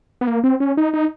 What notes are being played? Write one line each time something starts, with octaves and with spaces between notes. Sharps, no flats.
B3
A#3
C4
C#4
D#4
D#4